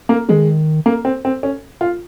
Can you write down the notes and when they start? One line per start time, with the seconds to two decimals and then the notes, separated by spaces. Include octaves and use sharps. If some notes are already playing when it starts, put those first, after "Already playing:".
0.09 A#3
0.29 D#3 G#3
0.86 A#3
1.05 C4
1.25 C4
1.43 C#4
1.81 F4